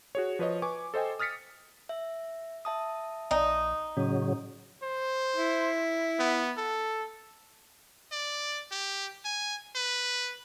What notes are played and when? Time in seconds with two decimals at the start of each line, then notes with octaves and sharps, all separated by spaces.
0.15 F#4 G#4 C#5
0.39 F3 B4 C#5 D#5
0.62 B4 G#5 C#6 D6
0.94 A4 C5 D#5 G5 G#5
1.19 D#6 F6 A6 B6 C#7
1.89 E5
2.65 E5 A5 D#6
3.31 A#1 D#4
3.97 A2 C#3 F#3 C#4
4.83 C5
5.36 E4
6.19 B3
6.57 A4
8.12 D5
8.72 G4
9.25 G#5
9.75 B4